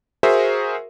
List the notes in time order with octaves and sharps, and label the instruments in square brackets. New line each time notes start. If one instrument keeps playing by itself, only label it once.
[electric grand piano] F#4 G#4 A#4 C5 E5